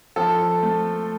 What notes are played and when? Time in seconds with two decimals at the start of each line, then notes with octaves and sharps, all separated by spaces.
0.16 F3 A4
0.63 A3